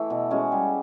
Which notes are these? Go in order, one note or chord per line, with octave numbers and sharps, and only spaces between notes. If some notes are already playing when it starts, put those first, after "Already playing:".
Already playing: E3 A3 E4
B2
G#3 C#4 F#4
G3